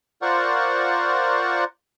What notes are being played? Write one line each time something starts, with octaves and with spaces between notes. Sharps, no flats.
F4 A#4 C5 D5 F#5 C#6